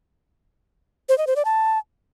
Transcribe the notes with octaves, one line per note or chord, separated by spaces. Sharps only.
C5
D#5
C5
D5
A5